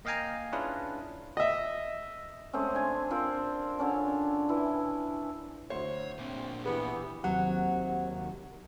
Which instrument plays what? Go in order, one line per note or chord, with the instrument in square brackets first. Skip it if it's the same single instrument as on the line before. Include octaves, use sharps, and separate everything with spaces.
[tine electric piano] A#3 D#5 F5 G5 G#5 A#5
C#4 D4 E4 F4 G#4 B4
[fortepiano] D#5 E5
[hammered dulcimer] G#3 A3 C4 C#4
D4 G#5
C4 F4 A#4
D3 C#4 D4
E3 E4
[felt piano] D2 C5 [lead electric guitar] C#5
[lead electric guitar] A#2 D4 [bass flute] C4
[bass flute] E3 [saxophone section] B3 G4 [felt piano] G#4
[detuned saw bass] D#2 [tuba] C3 [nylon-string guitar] F#3 [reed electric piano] F#5